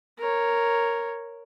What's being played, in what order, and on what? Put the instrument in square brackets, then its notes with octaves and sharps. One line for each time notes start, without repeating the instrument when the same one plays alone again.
[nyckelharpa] A#4 C#5